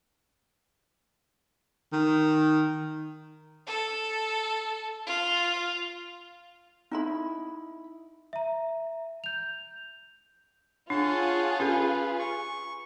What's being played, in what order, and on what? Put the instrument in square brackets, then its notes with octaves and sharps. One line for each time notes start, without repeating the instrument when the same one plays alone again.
[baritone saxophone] D#3
[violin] A4
F4
[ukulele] D#4 E4 B5
[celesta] E5 A#5
G6 F7
[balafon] D4 [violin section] F4 G#4 [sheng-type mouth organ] C#5 F#5 A5
[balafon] C#4 G4 A4 [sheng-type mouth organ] B4
[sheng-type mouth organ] C#6